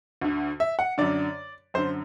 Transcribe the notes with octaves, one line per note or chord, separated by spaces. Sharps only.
D2 D3
E5
F#5
F#2 D3 D5
F#2 D3 C5